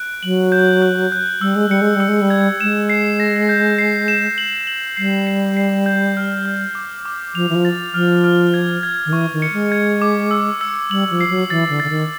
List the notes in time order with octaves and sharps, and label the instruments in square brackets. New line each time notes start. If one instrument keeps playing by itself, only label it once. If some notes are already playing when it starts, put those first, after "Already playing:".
Already playing: [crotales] F#6 D7
[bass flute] F#3 [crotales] F#7
[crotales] G6
F#6
F#6
[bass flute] G3 [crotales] E6
[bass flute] G#3
[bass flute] G3 [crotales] C#7
[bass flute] G#3
[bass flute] G3 [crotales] E6
[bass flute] G#3
G3
[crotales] G#6
[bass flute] G#3 [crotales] E7
[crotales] C7
A#6
G6
C7
E7
F#7
F#7
[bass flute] G3 [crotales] C7
[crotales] C7
C7
G6
F6
F6
D6
D6
[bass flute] F3 [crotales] F7
[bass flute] E3
F3
[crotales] A6
[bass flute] F3 [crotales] F6
[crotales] F6
G#6
G#6
[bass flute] D#3
[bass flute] E3 [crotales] C#6
[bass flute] D#3
[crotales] C#7
[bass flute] G#3
[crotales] G#6
D6
E6
E6
[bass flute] G3 [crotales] F#7
[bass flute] F3
[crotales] C7
[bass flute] F#3
[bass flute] E3 [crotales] A6
[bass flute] D3
[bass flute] D3 [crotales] A6
[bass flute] D#3